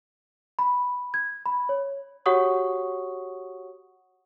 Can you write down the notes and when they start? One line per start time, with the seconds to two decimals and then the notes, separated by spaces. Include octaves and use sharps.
0.59 B5
1.14 G#6
1.46 B5
1.69 C#5
2.26 F#4 G4 C#5 F#5 C#6 D#6